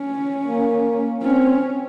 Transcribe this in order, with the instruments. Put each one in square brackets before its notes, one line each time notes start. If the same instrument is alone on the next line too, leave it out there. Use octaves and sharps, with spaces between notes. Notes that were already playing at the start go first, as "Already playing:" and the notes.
Already playing: [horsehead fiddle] C#4
[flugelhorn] A#3
[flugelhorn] C4 [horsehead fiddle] C#4